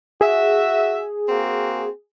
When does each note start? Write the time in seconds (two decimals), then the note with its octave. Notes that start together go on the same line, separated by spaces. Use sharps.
0.21 F#4 G#4 E5
1.29 A#3 C4 F#4